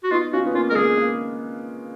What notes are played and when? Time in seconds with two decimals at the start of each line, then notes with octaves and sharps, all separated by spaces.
0.03 F#4
0.11 B3 D#4 F4
0.33 C#4 F4 F#4
0.46 B3
0.54 A#3 C#4 F4
0.70 G#3 A#4
0.75 A#3 G#4
0.97 A#3